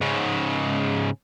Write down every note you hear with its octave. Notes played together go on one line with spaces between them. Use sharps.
G#2 C#3